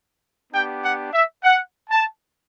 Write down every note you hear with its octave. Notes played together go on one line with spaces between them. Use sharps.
B3 D4 G4 G5
F#5
E5
F#5
A5